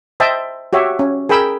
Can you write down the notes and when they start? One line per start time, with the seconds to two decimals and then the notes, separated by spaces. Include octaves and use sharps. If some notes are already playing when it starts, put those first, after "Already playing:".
0.20 C5 D#5 E5 G5 A5
0.73 F#4 G4 C#5 E5
0.99 C#4
1.29 G#4 A#4 G5 B5 E6